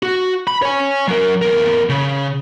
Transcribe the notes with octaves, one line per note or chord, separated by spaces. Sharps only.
F#4
B5
C#5 G#5
F#3 A#4
E2 A#4
C#3